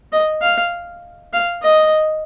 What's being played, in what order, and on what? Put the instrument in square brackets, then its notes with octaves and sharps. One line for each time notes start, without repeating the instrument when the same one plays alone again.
[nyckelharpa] D#5
F5
F5
D#5